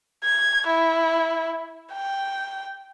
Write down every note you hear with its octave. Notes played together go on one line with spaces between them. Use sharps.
G#6
E4
G5